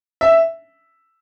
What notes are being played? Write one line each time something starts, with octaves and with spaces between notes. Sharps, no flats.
E5